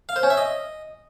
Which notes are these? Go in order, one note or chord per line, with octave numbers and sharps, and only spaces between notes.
F5
C5
C#4
E5
D#5